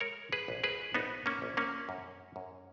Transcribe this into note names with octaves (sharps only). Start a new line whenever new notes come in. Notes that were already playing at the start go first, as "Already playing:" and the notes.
G#3 A#4 C#5
G#4 B4
A#1
G#4 B4
A#1 B3 D#4
A#3 C#4
A#1
A#3 C#4
F#2
F#2